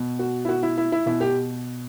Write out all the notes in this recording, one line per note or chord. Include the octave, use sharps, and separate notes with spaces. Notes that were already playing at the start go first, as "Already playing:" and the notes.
Already playing: B2
F#4
E4
F#4
E4
E4
E4
B2 E4
G4